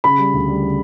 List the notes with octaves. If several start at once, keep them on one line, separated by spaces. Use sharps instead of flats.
C#3 B5
G3
D2
G3
C#3